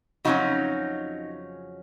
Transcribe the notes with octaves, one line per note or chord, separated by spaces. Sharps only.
F2 C#3 F#3 C#4 D#4 F#4